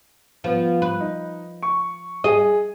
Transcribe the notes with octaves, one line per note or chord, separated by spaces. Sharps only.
F3 B3
B4
D#4
C#6
G#4 D#5